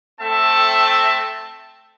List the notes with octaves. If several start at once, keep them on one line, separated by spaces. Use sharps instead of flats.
A3 C4 A4 E5 G5 A5